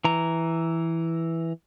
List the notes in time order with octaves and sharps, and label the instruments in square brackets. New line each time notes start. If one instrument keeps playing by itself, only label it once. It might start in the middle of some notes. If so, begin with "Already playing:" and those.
[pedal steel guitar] E3 A#5